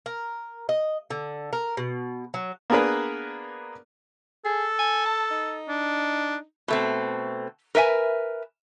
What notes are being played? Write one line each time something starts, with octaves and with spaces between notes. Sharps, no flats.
A#4
D#5
D3
A#4
B2
F#3
A#3 B3 D4 G#4 A#4 B4
G#4 A4
G#5
A5
D#4
D4
B2 A3 C4
A#4 B4 E5 G#5